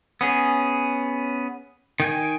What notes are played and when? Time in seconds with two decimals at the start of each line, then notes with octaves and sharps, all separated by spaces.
0.21 B3 C#4 G#4
2.00 D#3 G5 G#5